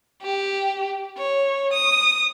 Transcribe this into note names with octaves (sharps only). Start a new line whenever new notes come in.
G4
C#5
D#6